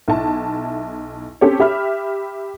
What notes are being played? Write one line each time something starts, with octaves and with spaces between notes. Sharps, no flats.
B1 E4 A5
C4 C#4 G4 A4 C#5
G4 E5 B5 F6